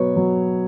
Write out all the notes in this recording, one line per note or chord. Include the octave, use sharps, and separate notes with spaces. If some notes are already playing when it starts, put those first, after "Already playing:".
Already playing: B2 F#3 B3 C#5
F#3